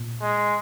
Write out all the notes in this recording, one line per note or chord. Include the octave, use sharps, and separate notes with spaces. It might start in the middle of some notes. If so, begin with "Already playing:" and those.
Already playing: A#2
G#3